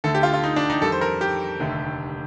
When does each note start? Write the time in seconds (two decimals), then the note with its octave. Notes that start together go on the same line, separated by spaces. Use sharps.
0.04 D2 D3 A3 A4
0.15 G4
0.23 F4
0.33 F4
0.43 D#4
0.56 D4
0.70 D#4
0.82 F2 D#3 G3 A4
0.92 C5
1.01 A#4
1.21 G4
1.60 F1 D#2 D3 A3